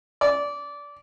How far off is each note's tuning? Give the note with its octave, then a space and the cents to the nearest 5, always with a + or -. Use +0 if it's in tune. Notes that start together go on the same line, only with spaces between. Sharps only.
D5 -20